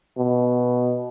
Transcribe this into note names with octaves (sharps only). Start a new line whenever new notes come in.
B2